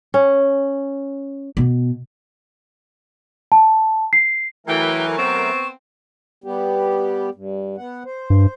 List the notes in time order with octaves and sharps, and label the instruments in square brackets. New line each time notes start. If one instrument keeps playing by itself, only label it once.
[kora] C#4
[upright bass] B2
[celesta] A5
C7
[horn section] E3 [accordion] F#3 A3 A#4 [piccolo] G5
[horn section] B3 C4 [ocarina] C#6 [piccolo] E7
[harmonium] G3 B3 G4
G2
B3 F#5
C5
[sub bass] G2